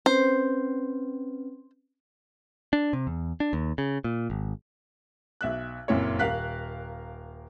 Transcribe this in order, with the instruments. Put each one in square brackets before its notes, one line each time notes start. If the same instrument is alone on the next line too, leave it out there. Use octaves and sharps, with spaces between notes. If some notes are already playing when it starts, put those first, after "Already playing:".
[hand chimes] C4 C#4 B4 [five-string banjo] C5
[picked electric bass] D4
C3
E2
D4
D#2
C#3
A#2
G#1
[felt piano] B1 E5 F#6
F#1 F2 A#2 E4 C#5
D#1 A#4 F5 F#6 B6